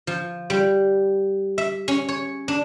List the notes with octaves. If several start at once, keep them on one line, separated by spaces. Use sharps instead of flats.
F3
G3
E5
C#4
C#5
D4